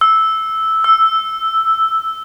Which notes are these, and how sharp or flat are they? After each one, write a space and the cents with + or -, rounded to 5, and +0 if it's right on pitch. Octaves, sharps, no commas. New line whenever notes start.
E6 -10
E6 +0